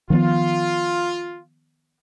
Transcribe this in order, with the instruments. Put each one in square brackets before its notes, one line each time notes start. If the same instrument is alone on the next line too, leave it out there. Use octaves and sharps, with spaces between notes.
[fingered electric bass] D#3 F3 B3 [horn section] F4